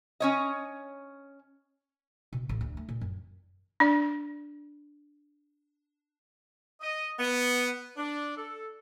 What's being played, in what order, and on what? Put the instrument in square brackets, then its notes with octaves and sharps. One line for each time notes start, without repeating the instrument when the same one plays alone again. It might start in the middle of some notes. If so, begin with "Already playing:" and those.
[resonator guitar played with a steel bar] C#4 C#5 D#5
[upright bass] B2
A1
D2
A3
A#2
F#2
[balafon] D4 D5
[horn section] D#5
B3
D4
A4